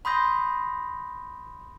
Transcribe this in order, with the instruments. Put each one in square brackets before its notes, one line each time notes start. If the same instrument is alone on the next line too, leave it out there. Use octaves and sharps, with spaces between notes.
[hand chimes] B5 C6 D#6 G6 A#6